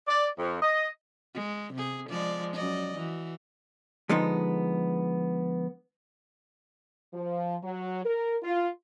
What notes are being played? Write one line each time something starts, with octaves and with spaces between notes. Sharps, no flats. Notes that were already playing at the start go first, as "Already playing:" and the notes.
D5
F2
D#5
G#3
C3 G#4
F3 G#3 D5
F#2 D5 D#5
E3 F#4
D3 F3 G#3 B3 D#4
F3
F#3
A#4
F4